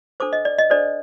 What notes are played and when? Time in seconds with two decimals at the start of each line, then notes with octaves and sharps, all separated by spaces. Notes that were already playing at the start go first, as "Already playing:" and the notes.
0.20 D4 A4 C5 D6
0.33 D#5
0.45 D5
0.58 D#5
0.70 D4 A4 C5 D5